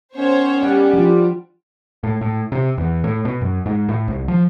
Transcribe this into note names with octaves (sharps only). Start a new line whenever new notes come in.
D#3 B3 C#4 C5 C#5
G3 G4 F#5
F3 D4 F4
A2
A2
C3
E2
A2
B2
F#2
G#2
A2
C2
F3